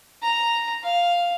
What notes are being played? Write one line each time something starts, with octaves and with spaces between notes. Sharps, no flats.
A#5
F5